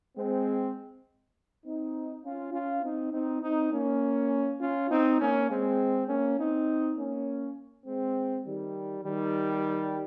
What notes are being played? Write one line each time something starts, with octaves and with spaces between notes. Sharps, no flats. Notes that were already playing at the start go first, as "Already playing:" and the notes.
G#3 C4
C4 D#4
C#4 F4
C#4 F4
C4 D#4
C4 D#4
C4 D#4
A#3 C#4
C#4 F4
C4 D#4
A#3 C#4
G#3 C4
A#3 C#4
C4 D#4
A#3 C#4
G#3 C4
D#3 G3
D#3 G3